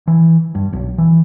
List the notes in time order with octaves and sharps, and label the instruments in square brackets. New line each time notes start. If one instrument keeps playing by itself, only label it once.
[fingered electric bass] E3
G2
B1
E3